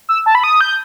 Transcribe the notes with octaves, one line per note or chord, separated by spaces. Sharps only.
E6
A5
B5
D#6
G6